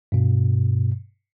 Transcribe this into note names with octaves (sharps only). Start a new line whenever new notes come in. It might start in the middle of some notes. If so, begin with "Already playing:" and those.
G2 B2